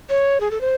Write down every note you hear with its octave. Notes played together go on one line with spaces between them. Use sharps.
C#5
G#4
A4
C5